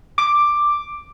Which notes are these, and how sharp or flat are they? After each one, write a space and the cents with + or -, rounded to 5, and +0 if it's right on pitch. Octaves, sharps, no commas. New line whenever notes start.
D6 +5